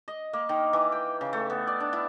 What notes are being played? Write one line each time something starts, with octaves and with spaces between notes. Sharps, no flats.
D#5
A#3
D#3
E3
G5
C#3
A3
B3
D5
D4
E4